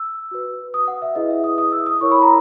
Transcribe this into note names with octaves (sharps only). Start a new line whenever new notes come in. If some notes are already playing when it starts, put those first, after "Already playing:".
Already playing: E6
F#4 B4
D#6
F#5
E5
E4 G#4 B4 D#5
E5
D#6
D#6
E6
D#6
E4 A#4 C#5 C#6
B5
A#5